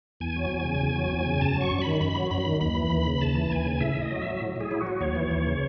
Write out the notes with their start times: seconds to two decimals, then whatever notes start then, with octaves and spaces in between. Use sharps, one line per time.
0.20 E2 G#5
0.36 F#3
0.51 E2
0.65 C#3
0.80 E2
0.96 F#3
1.11 E2
1.26 C#3
1.41 F#2 A5
1.56 F#3 C#6
1.71 F#2
1.81 B5
1.86 D#3
2.00 F#2 B5
2.16 F#3
2.31 F#2 B5
2.46 D#3
2.61 D#2 B5
2.76 E3
2.91 D#2
3.06 C#3
3.21 D#2 A5
3.35 E3
3.51 D#2 G#5
3.66 C#3
3.80 A2 E5
3.96 A2
4.02 D#5
4.11 F#3
4.22 F#3 E5
4.41 A2
4.56 A2 G#4
4.71 F#3 E4
4.81 F#4
4.87 F#3
5.00 D#2 C#5
5.15 E3
5.31 D#2
5.47 C#3